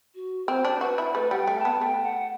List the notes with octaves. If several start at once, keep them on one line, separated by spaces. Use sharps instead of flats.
F#4
C4 C5
D4
F#4 B4
E4
A3 B4
G3 F#5
G5
A3
A5
B3
A3 G5
F#5